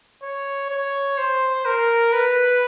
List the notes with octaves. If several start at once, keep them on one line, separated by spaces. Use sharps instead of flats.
C#5
C#5
C5
A#4
B4